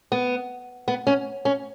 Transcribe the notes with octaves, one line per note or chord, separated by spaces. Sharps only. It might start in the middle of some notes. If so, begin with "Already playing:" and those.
B3
B3
C#4
C#4